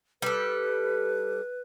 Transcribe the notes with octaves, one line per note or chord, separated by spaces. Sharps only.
G3 A4 B4